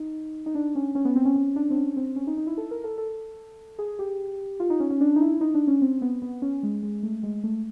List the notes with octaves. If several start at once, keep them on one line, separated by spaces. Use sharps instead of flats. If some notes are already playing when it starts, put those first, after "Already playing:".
Already playing: D#4
D#4
D4
C#4
C#4
B3
C4
C#4
C#4
D4
C4
C#4
C4
C#4
D#4
D#4
E4
A4
A#4
A4
A4
G#4
G4
F4
D#4
C#4
C#4
D4
D#4
E4
D#4
D4
C#4
C4
B3
B3
C#4
G#3
G#3
A3
G#3
A3